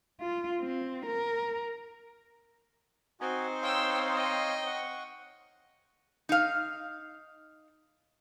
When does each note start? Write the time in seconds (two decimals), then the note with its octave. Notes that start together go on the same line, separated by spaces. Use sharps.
0.21 F4
0.61 C4
1.06 A#4
3.21 C4 D#4 F#4 C5 G#5
3.63 C#5 F5 G5 C6 E6
4.15 D#5 G5
4.66 F#5 C#6
6.29 D#4 F5